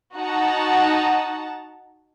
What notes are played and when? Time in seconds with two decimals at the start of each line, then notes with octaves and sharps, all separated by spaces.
0.16 D#4 F#4 F#5 A5 A#5